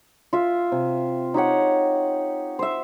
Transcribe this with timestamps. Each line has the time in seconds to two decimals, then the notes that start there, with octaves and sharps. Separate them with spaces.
0.33 F4 E5
0.72 C3
1.34 D#4 G4 C#5 F#5
2.59 C5 E5